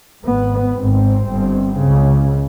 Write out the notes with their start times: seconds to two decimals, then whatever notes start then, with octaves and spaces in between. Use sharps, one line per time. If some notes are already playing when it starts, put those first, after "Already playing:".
0.25 G#1 G#2 B3
0.76 G#1 G#2 C4
1.27 G1 G2
1.78 C#2 C#3